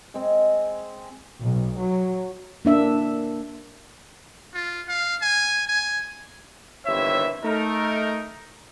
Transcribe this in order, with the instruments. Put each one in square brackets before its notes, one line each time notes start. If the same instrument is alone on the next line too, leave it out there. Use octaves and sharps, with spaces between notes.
[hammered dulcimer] G#3 C4
[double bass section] B1
F#3
[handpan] A#3 D4 E5
[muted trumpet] F4
F5
G#5
G#5
[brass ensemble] G1 D#2 E3 C4 C#5 E5
A3 D#4 A#4